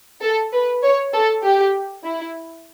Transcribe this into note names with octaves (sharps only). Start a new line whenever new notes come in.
A4
B4
C#5
A4
G4
E4